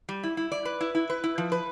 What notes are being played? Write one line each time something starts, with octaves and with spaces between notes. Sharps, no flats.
G3
E4
E4
D5
B4
E4
E4
B4
E4
F3
B4